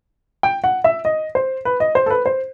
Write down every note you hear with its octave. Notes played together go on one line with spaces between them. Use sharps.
G5
F#5
E5
D#5
C5
B4
D#5
C5
A4
B4
C5